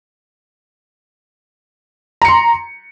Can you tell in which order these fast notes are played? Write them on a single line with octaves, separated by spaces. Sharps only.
A#5 C#7 C6